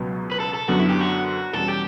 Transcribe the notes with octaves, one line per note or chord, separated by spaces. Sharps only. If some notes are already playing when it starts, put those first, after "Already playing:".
Already playing: C#2 B2 F#3 B3
B4
A4
A4
F#2 D3 F#3 B3 F#4
E4
G4
F#4
E2 B2 G3 C#4 A4
G4